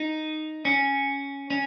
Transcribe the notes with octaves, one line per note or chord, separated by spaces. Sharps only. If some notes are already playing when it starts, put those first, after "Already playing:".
Already playing: D#4
C#4
C#4